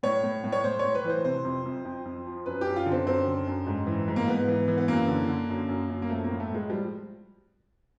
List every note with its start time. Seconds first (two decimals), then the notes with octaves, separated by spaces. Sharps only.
0.03 A2 C#5
0.24 A2
0.44 A2
0.52 C#5
0.64 A2 C5
0.79 A2 C#5
0.95 B4
1.04 E3
1.09 C5
1.25 C3 C5
1.44 F2
1.65 F2
1.85 F2
2.05 F2
2.26 F3
2.46 F#2 B4
2.61 F#2 G4
2.76 F4
2.86 D3
2.92 C4
3.06 F#2 C4
3.27 D3
3.47 F#2
3.67 G#2
3.87 E3
4.08 G#2
4.16 A#3
4.28 G#2 B3
4.48 E3
4.68 E3
4.78 B3
4.88 F#2 A#3
5.08 D3
5.28 D3
5.49 F#2
5.69 F#2
5.89 F#2
6.02 A#3
6.09 F3 A3
6.24 A#3
6.30 A2
6.40 A3
6.50 A2 G#3
6.69 F3 G3